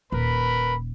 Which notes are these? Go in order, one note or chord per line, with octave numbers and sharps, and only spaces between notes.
D#1 A#4 B4 B5